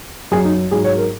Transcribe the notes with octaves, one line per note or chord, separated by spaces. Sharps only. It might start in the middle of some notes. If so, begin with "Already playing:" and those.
F#2 F#3 G#4
D#4
G#2 F#3 G#4
C#5
A#4